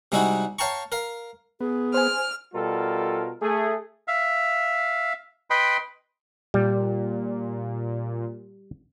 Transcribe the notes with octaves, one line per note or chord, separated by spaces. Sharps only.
C3 G3 G#3 D#4 E4 F#4
C#5 F5 G5 A5 A#5 C#6
A#4 F5
B3 G#4
C5 G#5 F6
B2 G3 F4 A4 A#4
A3 G#4
E5 F5
B4 D#5 G5 B5 C6
A#2 G3